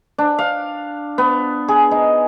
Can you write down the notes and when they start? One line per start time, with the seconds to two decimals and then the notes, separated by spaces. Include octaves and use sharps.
0.18 D4
0.39 F5
1.18 B3
1.68 G#4
1.91 D#4